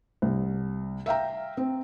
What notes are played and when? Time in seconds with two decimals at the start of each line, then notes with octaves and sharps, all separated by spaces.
0.22 C2
1.06 E5 F5 G5 A#5
1.57 C4